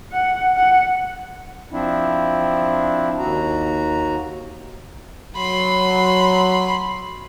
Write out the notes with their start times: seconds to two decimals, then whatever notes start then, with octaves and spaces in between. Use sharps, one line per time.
0.12 F#5
0.56 F#5
1.72 F3 C4 D4 E4
3.19 D#2 F#4 A#5
5.36 F#3 B5 C6